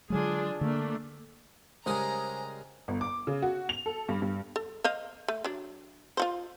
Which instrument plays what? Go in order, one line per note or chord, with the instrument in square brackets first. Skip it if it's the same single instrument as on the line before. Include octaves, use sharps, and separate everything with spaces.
[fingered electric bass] D3 F#3 G#3 [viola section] D4 F4 G#4
[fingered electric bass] D3 [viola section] A3 A#3 D4
[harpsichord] C#3 G#4 A#4 [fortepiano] G3 G#3 [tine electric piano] C5 G#5 [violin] A#5
[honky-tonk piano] G1
D6
C#3
F#4
F7
A4
G2
G2
[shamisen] A4
C5 D#5 F5
A3
F#3 D4
F4 F#4 C5